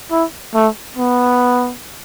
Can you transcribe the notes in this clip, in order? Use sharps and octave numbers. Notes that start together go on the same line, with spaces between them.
E4
A3
B3